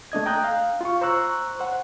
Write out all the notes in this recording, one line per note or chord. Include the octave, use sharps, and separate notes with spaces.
A3 D4 D#5 G#6
G5 A#5 D#6 F#6 G6
F5
F4 C#6
C5 A#5 C#6 E6 F#6
C5 F#5